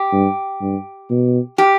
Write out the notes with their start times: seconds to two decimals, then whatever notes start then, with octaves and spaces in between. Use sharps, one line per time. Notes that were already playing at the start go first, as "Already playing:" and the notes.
Already playing: G4
0.12 G2
0.61 G2
1.10 B2
1.58 G4